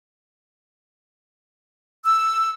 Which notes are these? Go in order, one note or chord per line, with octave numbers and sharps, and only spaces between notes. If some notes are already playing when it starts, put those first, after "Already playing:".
E6